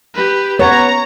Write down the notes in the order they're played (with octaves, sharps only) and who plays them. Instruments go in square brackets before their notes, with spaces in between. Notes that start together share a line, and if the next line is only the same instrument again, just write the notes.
[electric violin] G4 B4
[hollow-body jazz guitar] B3 F#5 [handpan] C#5 [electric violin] A#5